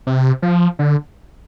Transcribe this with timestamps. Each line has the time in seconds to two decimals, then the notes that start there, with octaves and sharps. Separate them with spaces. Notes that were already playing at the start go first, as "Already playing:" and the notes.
0.07 C3
0.42 F3
0.79 D3